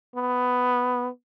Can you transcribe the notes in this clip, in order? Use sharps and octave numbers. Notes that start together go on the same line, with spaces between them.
B3